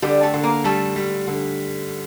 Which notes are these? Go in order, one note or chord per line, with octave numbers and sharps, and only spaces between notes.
D3 G3 G4
A3 A4
D3
A#3 A#4
G3 A3 A4
G3
D3